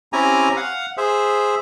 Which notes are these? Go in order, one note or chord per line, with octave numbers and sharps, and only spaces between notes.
C4 C#4 E4 G4 G#5 A#5
F5 F#5
G#4 C5 E5